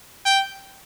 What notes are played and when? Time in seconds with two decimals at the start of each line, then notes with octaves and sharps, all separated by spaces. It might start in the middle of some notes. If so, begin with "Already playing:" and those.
0.26 G5